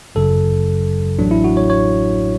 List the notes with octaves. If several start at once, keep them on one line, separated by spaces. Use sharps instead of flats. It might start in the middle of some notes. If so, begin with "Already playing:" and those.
G1 F#2 C#3 F#3 A4
A1 A2 F#3 D4
E4
F#4
C#5
C#5